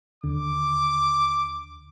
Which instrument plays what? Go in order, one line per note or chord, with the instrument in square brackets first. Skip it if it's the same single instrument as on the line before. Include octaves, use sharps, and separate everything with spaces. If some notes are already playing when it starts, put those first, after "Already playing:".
[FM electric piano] D#2 D3 [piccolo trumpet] D6